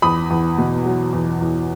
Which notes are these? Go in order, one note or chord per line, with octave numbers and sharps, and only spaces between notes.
E2 B5 D#6
E2
B2
F#3
E2
E2